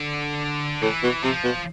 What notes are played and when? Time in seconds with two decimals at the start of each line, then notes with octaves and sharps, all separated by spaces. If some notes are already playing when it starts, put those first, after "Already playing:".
Already playing: D3
0.82 A2 E3
1.03 B2
1.24 C3 F3
1.44 B2